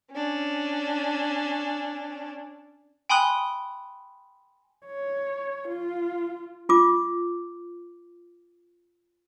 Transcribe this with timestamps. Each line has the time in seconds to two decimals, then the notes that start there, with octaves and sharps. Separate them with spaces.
0.11 C#4 D4
3.09 G5 G#5 B5 C6 D#6 F#6
4.86 C#5
5.68 F4
6.69 F4 D6